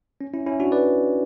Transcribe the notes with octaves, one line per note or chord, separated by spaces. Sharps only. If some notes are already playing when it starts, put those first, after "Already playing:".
C#4
C#4 E4
C#4 E4
D4 F#4
B4 D5